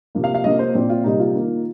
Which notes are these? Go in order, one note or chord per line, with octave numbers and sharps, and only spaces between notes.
C3 F3 A#3
F5
F5
C3 F3 A#3 D#5
C5
A#2 F3 C4
F4
C3 G3 A#3 D#4
F4
D#3 A#3